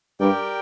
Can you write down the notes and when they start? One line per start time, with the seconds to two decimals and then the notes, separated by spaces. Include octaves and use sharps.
0.20 G2 G4 A#4 D5 G5